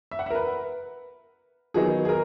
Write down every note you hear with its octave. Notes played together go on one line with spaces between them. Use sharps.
E5
F#5
E5
A#4
B4
D#3 F#3 B3 D#4 G#4
G#4
A#4